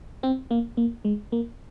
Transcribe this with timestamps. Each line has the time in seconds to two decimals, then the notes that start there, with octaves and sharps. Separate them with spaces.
0.23 C4
0.51 A#3
0.77 A#3
1.05 G#3
1.32 A#3